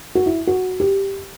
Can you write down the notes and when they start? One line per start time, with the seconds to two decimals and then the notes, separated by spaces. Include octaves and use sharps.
0.15 F#4
0.26 E4
0.47 F#4
0.80 G4